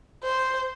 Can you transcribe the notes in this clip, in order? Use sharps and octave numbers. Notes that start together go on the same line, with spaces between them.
C5